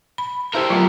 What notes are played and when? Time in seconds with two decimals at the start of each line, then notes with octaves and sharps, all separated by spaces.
0.18 B5
0.54 E4 G4 A4 A#4 C5
0.70 F#3 A3 B3 F4 E5